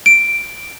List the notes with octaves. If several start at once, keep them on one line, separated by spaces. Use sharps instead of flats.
D7